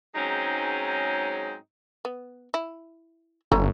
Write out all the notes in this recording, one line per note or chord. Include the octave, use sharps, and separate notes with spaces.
G#2 F#3 G#3 C4 C#4 D#4
B3
E4
G1 A3 C#4 A#5